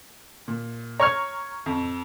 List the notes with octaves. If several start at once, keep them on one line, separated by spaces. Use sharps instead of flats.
A#2
C#5 A#5 C#6 F6 G#6
F2